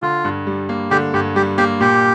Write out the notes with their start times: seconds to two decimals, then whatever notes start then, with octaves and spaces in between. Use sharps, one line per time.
0.03 D3 F4
0.25 G2
0.47 G3
0.69 A#3
0.91 D3 G4
1.14 G2 G4
1.36 G3 G4
1.58 A#3 G4
1.81 A#2 G4